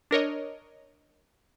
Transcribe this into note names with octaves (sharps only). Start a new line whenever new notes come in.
D4 A#4 C#5 D#5